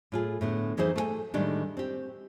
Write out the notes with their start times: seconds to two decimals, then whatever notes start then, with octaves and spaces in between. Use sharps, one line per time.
0.12 A2 F4 G#4
0.41 A2 D3 B3
0.77 F2 E3 D#4 E4 G#4 C5
0.96 A3 G#4 G#5
1.34 A2 D#3 G3 G#3 D4
1.77 C4 G4